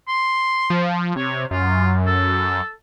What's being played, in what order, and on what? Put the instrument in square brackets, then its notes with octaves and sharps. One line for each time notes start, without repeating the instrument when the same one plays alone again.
[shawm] C6
[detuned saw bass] F3
[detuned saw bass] C3 [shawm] C#5
[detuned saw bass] F#2 [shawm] F4
[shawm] A4